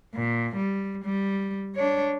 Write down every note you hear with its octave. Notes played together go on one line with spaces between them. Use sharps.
A#2
G3
G3
D4 C#5